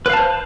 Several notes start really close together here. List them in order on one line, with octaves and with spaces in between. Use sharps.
B4 F5 A5 C5